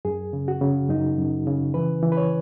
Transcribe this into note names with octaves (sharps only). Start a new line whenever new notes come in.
F#2 G#4
C#3
F#4
C#3
F#2 D#4
F#2
C#3
E3 B4
E3
B4
C#5